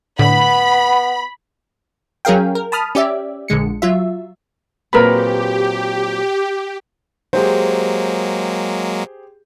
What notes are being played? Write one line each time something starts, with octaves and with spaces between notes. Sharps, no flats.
A2 D3 B3 B5
F#3 C#4 G#4 A#4 F5 G5
A#4
A5 B5 D#6 F6
C#4 G4 D5 E5
A#1 D3 G#3 C#7
F#3 F4 E5
A#2 F#3 C4 G4 G#4 A#4 B4 B5
F#3 G#3 A#3 G4 G#4 C5